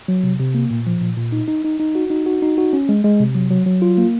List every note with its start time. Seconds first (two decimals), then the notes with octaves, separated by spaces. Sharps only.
0.08 F#3
0.24 C3
0.40 C3
0.54 A#3
0.70 A#2
0.87 F3
1.01 A#2
1.17 A#2
1.32 D#4
1.48 D#4
1.64 D#4
1.80 D#4
1.95 F#4
2.10 D#4
2.26 F#4
2.42 D#4
2.58 F#4
2.73 C#4
2.89 G#3
3.04 G#3
3.20 C3
3.35 F#3
3.50 F#3
3.66 F#3
3.82 F4
3.98 A#3